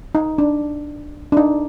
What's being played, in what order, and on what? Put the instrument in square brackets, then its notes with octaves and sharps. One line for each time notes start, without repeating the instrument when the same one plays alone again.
[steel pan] D#4
D4
D4
D#4